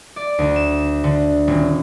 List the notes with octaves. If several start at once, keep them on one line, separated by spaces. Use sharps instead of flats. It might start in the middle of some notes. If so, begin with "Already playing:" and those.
D5
D2
E7
D3
D#1